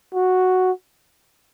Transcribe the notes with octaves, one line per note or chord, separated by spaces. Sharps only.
F#4